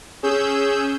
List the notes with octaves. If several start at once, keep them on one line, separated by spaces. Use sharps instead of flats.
C#4 G#4 E6 G6